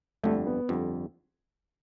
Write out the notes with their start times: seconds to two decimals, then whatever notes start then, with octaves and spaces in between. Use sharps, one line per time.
0.24 G1 F2 D3 G3 A3
0.47 B3
0.69 G1 F2 D3 G3